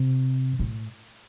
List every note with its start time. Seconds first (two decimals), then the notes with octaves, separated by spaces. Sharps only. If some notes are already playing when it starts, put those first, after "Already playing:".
Already playing: C3
0.59 A2